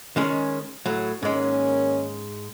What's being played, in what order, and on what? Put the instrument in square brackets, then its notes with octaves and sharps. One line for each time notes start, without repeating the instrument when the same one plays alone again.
[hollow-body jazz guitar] D#3 G#3 C#4
A2 F#3
[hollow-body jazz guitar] G#2 G#3 [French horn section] D#3 A#3 C#4